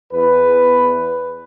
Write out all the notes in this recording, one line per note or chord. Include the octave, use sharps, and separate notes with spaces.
E2 B4